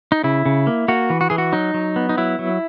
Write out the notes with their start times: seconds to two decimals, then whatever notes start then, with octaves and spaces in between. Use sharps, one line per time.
0.12 D#4
0.24 C#3 E4
0.46 C#3
0.67 A#3
0.88 A#3 F#4
1.10 E3
1.21 F#4
1.30 E3 G#4
1.38 F#4
1.53 F#3 D#4
1.74 F#3
1.96 B3
2.09 D#4
2.17 F#3 E4
2.39 F#3